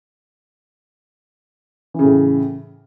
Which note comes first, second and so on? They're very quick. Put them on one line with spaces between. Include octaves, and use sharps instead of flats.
E3 C#3 A2